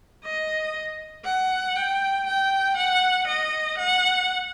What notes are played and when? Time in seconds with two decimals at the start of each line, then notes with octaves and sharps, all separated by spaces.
0.24 D#5
1.25 F#5
1.76 G5
2.26 G5
2.77 F#5
3.27 D#5
3.78 F#5